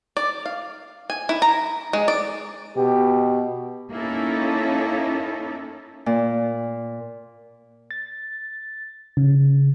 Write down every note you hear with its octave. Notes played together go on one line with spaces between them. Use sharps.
D5
F5
G#5
E4
A#5
G#3
D5
B2 G4
A#3 C#4 D#4 E4 A4
A#2
A6
C#3